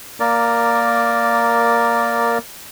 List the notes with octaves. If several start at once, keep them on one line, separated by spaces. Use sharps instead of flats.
A#3 A#4 D5